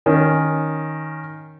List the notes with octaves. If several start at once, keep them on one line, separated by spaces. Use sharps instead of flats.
D#3 C#4